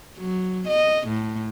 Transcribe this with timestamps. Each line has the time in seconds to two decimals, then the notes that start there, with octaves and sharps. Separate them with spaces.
0.18 F#3
0.68 D#5
1.08 A2